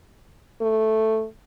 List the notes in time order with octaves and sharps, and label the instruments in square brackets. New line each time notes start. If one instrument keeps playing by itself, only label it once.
[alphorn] A3